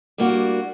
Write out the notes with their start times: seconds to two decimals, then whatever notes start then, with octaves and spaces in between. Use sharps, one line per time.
0.18 G3 A#3 D4 F#4